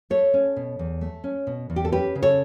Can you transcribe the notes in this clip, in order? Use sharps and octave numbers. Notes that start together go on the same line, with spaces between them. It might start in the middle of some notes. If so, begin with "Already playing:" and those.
A3 A4 C#5
C#4
B2
E2
A3
C#4
B2
E2
G4
A4
C#4 G4 B4
C#3
A4 C#5